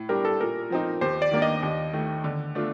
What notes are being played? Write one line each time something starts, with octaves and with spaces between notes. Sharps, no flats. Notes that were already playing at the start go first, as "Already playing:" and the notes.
Already playing: A2
G3 D4 G4 A#4
A4
A#2 A#4
F3 C4 D#4
D#2 C5
D5
D#3 A#3 D4
D#5
D#2
D#3 A3
D3
A3 D4 F4